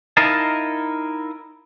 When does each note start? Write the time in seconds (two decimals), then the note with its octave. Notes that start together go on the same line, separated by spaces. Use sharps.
0.17 D#4 E4 A#4 D#5 F5 A5